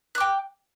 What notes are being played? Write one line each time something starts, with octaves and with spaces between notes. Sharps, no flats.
G5 D6 F#6